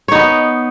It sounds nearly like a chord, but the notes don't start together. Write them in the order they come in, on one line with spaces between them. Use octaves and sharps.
C#5 D#4 B3